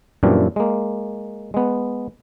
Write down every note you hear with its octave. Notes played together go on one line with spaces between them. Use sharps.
F#2 A#2 E3 G3 C4 D4
G#3 A#3
G#3 B3